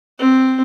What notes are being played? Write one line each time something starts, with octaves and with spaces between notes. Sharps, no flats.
C4